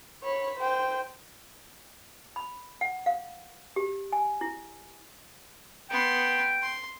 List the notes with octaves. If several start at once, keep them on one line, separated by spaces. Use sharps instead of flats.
C#5 B5
C5 G5
B5
F#5
F5
G4
G#5
E4
B3 G5 C6
C6